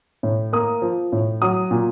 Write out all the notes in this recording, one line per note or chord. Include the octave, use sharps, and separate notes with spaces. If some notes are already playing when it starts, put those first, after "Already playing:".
A2
A#3 D#6
F3
A2
F#3 D#6
A#2